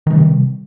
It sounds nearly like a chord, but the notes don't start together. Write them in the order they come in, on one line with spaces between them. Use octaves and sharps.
D#3 G#3 G3 C3